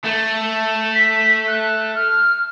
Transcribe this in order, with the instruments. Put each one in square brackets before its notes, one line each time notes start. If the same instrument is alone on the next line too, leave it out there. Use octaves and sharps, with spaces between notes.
[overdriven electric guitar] A3
[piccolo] B6
F#6
F6